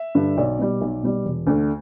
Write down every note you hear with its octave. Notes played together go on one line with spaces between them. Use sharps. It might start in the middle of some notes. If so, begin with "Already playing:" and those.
Already playing: E5
G2 D3
B1 D5
B2 G3
B1
B2 G3
E1
D2 D3 A3